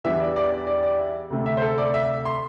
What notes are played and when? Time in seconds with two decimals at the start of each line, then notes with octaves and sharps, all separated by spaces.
0.04 E2 E3 G3 D4 E5
0.20 D5
0.36 D5
0.52 D5
0.67 D5
0.83 D5
0.99 E5
1.30 D2 C3 A3 C4
1.46 E5
1.57 C5
1.62 A4
1.78 D5
1.94 E5
2.25 C6